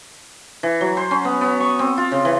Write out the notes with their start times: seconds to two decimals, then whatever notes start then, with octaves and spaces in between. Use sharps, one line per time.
0.63 E3
0.81 F#3
0.97 C5
1.11 C#4
1.25 B3
1.41 B3
1.60 C#6
1.79 C4
1.97 F4
2.12 C#3
2.25 E3